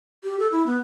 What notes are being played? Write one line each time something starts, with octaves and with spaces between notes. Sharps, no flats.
G4
A4
E4
B3